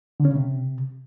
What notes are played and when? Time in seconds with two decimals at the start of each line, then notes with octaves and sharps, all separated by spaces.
0.20 D3
0.25 C#4
0.30 C#3
0.35 C3